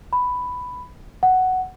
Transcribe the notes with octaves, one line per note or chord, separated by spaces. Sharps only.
B5
F#5